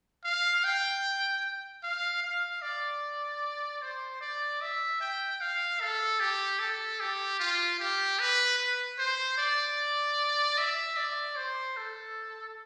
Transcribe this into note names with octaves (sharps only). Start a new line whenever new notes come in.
F5
G5
F5
F5
D5
C5
D5
E5
G5
F5
A4
G4
A4
G4
F4
G4
B4
B4
C5
D5
E5
D5
C5
A4